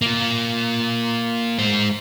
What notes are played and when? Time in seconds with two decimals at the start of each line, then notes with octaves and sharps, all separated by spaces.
0.02 A#3 F4
1.59 G#3 C5